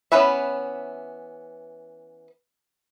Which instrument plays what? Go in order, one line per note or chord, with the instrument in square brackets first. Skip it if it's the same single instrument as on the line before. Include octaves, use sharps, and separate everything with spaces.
[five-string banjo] E3 B3 C#4 B4 E5